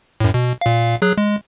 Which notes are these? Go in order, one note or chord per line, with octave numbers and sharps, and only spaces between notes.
F#2 A2
B2
A#2 F5
F#3 G#4 F#6
G#3